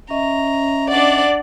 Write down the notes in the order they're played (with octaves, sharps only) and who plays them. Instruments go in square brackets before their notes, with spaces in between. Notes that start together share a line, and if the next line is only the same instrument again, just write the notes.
[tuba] C#4 [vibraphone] D#5 E5 C#6 [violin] A#5
[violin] D4 F#5 [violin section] D5